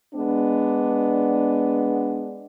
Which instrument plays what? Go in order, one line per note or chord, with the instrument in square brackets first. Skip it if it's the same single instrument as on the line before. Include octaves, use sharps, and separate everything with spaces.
[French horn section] G#3 B3 D4